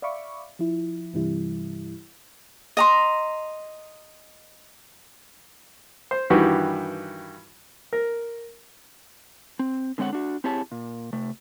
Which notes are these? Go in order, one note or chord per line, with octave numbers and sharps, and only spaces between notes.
D5 E5 F5 B5 C#6 D6
F3 E4
G2 C3 E3 G3 E4
D#5 A#5 C6
C5
G2 D#3 E3 F#4 G4 B4
A#4
C4
D3 G#3 C4 C#5 F#5
D4 F#4
C4 E4 G4 G#4 C#5 A5
A#2
C3 A3